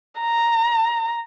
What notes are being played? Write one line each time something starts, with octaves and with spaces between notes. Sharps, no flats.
A#5